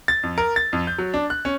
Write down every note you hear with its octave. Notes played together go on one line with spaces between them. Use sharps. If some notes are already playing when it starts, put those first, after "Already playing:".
A6
F2
A#4
A6
F2
G6
F#3
D4
F#6
C#4